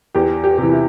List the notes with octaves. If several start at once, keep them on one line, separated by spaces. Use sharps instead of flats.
E2 G4
G4
C3
E3
E4